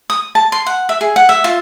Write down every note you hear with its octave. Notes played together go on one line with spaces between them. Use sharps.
D#6
A5
C6
F#5
E5
G#4
F#5
E5
F4